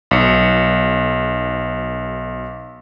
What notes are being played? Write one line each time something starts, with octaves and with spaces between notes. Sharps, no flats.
B1 C#7